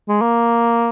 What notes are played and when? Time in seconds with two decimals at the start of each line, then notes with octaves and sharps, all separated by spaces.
0.08 G#3
0.21 A#3